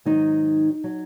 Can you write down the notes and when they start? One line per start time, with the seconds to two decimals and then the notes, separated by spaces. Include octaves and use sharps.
0.05 G#2 D#3 F#3 D#4
0.84 F#3